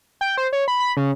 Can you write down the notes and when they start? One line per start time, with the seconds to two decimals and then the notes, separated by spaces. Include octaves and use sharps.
0.21 G5
0.37 C5
0.53 C#5
0.68 B5
0.80 B5
0.97 C#3